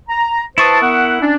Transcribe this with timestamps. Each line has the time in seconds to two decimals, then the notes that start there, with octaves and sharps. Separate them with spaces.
0.09 A#5
0.58 E4 B4 C5 A5 C#6 D#6
0.81 B3 A#4 F#5
1.21 C#4 D4